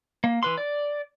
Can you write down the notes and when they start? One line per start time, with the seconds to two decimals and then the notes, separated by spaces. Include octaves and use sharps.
0.24 A#3
0.43 E3 B4 C6
0.58 D5